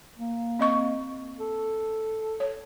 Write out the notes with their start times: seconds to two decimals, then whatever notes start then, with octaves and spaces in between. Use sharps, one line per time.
0.18 A#3
0.59 C4 D#5 C#6
1.40 A4
2.40 C#5